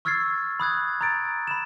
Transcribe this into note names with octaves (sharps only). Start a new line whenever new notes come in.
C#6 E6 F6 G#6 A6 C7
B5 D#6 F#6 G#6
A#5 G#6 A6 D7
B5 E7